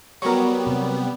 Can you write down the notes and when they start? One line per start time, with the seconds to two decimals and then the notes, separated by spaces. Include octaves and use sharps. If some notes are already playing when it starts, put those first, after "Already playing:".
0.22 F#3 G3 B3 A#4 C#6
0.67 C3